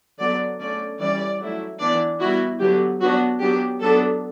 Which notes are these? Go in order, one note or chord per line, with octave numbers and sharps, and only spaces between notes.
D3 F#3 B3 D5
D3 A3 C#4 D5
E3 G3 C#4 D5
F#3 A3 E4
E3 B3 D4 D5
G3 B3 E4 F#4
D3 F#3 B3 G4
F#3 B3 D4 F#4
F#3 B3 D4 G4
F#3 B3 D4 A4